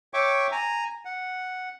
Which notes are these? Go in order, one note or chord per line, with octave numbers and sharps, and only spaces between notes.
C#5 E5 G5 C#6 D6
G#5 A#5
F#5